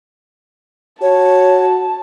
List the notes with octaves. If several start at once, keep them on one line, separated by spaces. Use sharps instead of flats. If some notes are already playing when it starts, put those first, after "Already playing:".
F#4 C#5 A5